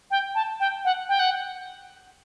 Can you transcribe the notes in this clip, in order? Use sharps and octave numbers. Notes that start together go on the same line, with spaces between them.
G5
A5
G5
F#5
G5
F#5